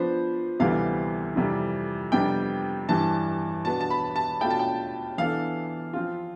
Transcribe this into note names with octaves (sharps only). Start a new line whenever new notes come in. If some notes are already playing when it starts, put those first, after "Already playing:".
Already playing: F3 B3 D4 B4 C5
D2 C3 E3 G3 B3 F5
F2 C3 E3 G3
F2 C3 G3 B3 D4 G5
G2 E3 G3 A5
B2 B3 D4 A5
A5
B5
A5
B2 A3 D4 F4 G5
A5
G5
E3 B3 D4 A4 F5
F3 C4 F4